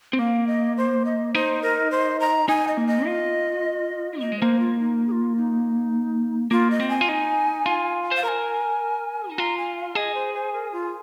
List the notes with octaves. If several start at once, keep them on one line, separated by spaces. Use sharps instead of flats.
C4
A#3 F5
D#5
C5
D#5
D#4 C5
A#4
C5
A#5
D#4 G#5
D#5
A#3
D#5
F4
A#3 D#5
G#3
A#3 C5
F4
D#4
G#4
F4
D#4
A#3 F4
D#5
C4
G#5
F4
D#4
F4
C5
F5
A#4 A#5
G#5
D#4
F4 A#5
G#5
F5
G#4 D#5
C5
C5
A#4
F4